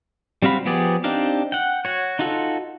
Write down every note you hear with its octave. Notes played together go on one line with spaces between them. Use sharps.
G3 C4 F#4 F5 B5
F3 B3 G4 G#4 D5
C4 D4 D#4 G4 F5
F#5 G5
F#4 C#5
D#4 F4 F#4 A4